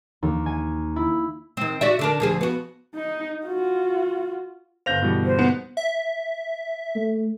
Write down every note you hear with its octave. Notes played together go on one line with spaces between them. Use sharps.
D#2
G#5
E4
D#3 C4
F#4 D5 E5
D3 D4 A#4
D2 F3 G#4
B3 F#4
D#4
F4 F#4
G1 C5 F5 G6 A#6 F7
B2 E3 G3
C5
B3
E5
A3